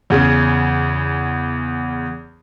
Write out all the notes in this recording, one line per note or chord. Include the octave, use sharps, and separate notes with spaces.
E2 C#3